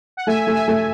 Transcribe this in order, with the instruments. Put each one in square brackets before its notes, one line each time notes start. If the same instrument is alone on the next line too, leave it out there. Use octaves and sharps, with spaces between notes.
[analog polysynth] F#5
[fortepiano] A3 [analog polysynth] E5 G#5
[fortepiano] A3
[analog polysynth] E5 G#5
[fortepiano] A3